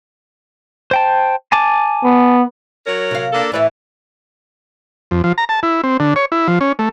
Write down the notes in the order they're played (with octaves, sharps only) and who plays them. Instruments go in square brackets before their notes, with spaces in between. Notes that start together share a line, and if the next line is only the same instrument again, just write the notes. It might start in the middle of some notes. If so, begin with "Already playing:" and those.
[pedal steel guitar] C5 G5 A5
G#5 A5 D6
[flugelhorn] B3
[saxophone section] F#3 A#4 C#5
[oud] C3 F5
[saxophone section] A#3 D4 A4
[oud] A2 D5 E5 [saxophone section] E3
[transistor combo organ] F2
F3
A#5
A5
E4
C4
D3
C#5
E4
F3
C#4
A3